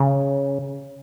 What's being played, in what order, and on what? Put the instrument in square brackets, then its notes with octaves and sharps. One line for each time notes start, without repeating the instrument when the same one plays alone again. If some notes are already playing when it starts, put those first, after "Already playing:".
Already playing: [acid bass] C#3